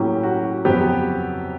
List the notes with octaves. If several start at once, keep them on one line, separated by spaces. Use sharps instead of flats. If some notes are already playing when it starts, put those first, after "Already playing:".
Already playing: A2 F#3 A#3 C#4 G4
F#4
F2 C#3 F#3 B3 G4